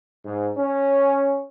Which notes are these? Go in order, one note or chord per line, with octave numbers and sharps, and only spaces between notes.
G#2
C#4